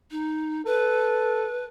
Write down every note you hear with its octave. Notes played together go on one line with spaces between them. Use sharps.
D#4
A4 B4